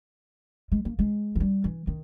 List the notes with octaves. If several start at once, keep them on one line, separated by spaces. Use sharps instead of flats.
G#3
A#3
G#3
E3
G3
E3
D#3